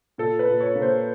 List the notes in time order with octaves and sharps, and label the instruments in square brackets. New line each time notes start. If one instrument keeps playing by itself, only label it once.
[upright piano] A#2 A4
B4
A#2
C#5
A#3
C5